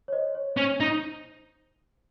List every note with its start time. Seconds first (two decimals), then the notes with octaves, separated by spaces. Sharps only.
0.08 C#5
0.13 C5 D#5
0.35 C#5
0.57 C#4 C5
0.80 D#4